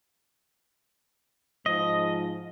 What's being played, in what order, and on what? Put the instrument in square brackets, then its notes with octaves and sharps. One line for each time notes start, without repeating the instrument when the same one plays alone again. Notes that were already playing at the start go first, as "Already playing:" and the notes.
[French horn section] G#2 F3 [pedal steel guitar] D#5